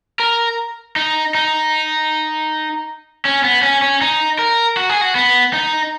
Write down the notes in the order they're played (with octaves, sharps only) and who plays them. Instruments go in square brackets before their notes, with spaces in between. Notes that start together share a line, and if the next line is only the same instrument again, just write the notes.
[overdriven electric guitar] A#4
D#4
D#4
C#4
B3
C#4
C#4
D#4
A#4
F#4
G#4
F#4
B3
D#4